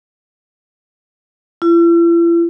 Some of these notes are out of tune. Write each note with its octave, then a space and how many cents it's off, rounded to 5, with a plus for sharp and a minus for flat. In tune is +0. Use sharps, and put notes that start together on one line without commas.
E4 +45